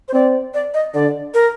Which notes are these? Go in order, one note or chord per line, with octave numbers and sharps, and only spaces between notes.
C5
C4 D5
D5
D#5
D3 D5
A#4